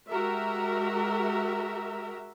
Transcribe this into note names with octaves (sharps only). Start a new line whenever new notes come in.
G#3 F#4 G4 A#4 E5